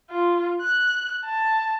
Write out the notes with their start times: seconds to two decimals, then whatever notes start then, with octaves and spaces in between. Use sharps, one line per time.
0.10 F4
0.61 F#6
1.25 A5